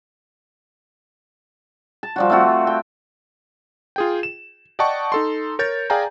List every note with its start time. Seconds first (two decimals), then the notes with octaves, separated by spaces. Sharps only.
2.03 A5
2.16 F3 G3 F#4
2.30 A3 C4 F4 F#4
2.67 G5
3.96 F4 G#4 G5
4.23 E7
4.79 D5 D#5 F#5 G5 A5 C#6
5.12 D#4 A4 C6
5.59 A#4 C#5 G6 A6
5.90 G#4 D5 F5 G5 G#5 A#5